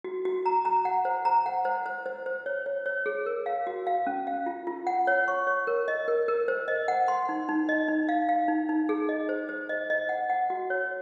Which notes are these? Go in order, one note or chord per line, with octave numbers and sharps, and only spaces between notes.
F#4
F#4
A#5
A#5
F#5
C5
A#5
F#5
C5
C5
C5
C5
C#5
C#5
C#5
G#4
A#4
F5
F#4
F5
C#4
F5
F4
F4
F#5
C#5
C#6
C#5
A#4
D#5
A#4
A#4
C5
D#5
F#5
C6
D#4
D#4
D#5
D#4
F5
F5
D#4
D#4
G#4
D#5
C5
C5
D#5
D#5
F#5
F#5
F#4
C#5